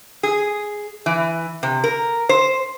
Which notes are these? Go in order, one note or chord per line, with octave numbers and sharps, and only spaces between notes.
G#4
E3
C3
A#4
C5